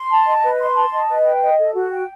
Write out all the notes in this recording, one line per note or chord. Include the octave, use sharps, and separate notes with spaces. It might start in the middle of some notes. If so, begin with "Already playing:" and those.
Already playing: C6
A5
D#5
B4
C6
A5
D#5
B4
G5
D#5
A4
F#4
G5